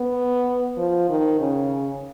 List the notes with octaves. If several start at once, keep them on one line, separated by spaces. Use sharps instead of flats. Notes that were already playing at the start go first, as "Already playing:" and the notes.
Already playing: B3
F3
D#3
C#3